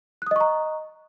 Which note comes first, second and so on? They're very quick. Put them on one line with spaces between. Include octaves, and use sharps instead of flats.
F#6 D#6 D#5 C#6 A#5